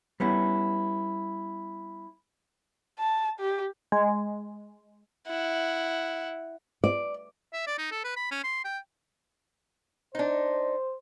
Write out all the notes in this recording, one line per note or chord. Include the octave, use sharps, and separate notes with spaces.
G3 B3 C#4 E4
A5
G4
G#3
E4 F#5
D5
E5
D5
D#4
A4
B4
B5
C#4
C6
G5
D4 D#4 C5